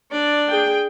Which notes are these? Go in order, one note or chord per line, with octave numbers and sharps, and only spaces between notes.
D4 D5
G#4 G5